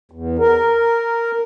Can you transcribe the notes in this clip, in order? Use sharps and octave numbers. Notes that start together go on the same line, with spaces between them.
E2
A#4